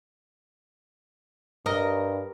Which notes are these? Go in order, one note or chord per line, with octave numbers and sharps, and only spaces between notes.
G2 A#4 D#5